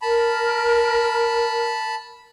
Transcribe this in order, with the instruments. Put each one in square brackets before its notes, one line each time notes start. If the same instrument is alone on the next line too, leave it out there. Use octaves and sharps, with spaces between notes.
[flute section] A#4 [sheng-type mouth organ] A5 B5